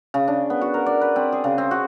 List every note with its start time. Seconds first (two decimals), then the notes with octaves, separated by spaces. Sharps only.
0.14 C#3
0.28 D4
0.50 B3
0.62 F#4
0.74 A#4
0.86 D5
1.01 B4
1.16 C4
1.32 G#4
1.44 C#3
1.58 C4
1.71 F#4